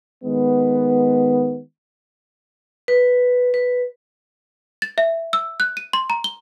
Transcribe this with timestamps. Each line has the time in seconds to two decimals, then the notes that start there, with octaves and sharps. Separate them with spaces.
0.24 D#3 G#3 B3
2.88 B4
3.54 B4
4.82 A6
4.98 E5
5.33 E6
5.60 F#6
5.77 D#7
5.93 C6
6.10 A#5
6.24 G7